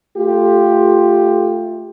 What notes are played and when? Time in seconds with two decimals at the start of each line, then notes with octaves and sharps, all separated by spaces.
0.18 A3 F4 G4